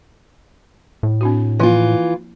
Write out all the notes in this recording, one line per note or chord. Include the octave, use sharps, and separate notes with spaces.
A2
C4 D4 F#4
E3 F3 A#3 E4 F4